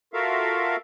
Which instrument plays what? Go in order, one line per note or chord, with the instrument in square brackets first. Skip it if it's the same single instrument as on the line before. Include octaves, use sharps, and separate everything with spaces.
[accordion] F4 F#4 A4 A#4 E5 F5